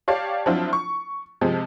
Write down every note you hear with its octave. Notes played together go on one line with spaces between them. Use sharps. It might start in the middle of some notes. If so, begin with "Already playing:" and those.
G4 C#5 D5 F5 A5
F3 F#3 C4 D4 E4 F4
C#6
C3 F3 G#3